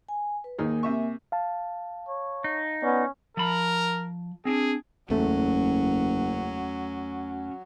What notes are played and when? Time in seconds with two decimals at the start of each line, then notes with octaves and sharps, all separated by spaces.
0.09 G#5
0.44 B4
0.58 D#2 A#3 D#4 G#4 A#4 G#5
0.83 C3 E5 C#6
1.32 F5 A5
2.08 C#5
2.44 D#4
2.83 B3 C#4 D5
3.37 F3 A#4 B5
4.45 C4 D4 G#4
5.10 F#1 E2 F#3 A3 C#4